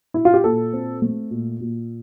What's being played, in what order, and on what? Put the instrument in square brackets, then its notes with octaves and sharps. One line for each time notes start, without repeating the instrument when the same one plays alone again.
[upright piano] E4
F4
G4
A#2 A4
C4
A3
A#2
A#2